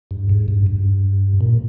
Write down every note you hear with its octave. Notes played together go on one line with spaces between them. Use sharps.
G2
G#2
G2
G2
A#2